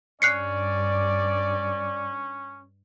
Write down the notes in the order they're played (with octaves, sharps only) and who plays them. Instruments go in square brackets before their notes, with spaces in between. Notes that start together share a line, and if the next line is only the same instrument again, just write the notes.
[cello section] G2 [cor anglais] C#4 [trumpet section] D5 [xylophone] F#6 C7 C#7